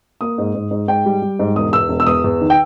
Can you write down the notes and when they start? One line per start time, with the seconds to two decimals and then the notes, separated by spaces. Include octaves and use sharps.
0.21 A#3 D#6
0.38 G#2
0.54 G#2
0.71 G#2
0.88 G#2 G5
1.05 G3
1.22 G3
1.39 G#2
1.56 E1 D#6
1.73 E2 E6
1.89 E1
2.00 E6
2.07 E2 D#6
2.24 E2
2.41 D#3
2.50 G5